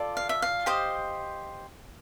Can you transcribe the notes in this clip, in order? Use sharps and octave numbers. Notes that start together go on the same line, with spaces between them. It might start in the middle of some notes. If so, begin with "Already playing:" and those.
Already playing: F4 A4 D5
F5
E5
F5
G4 C5 D#5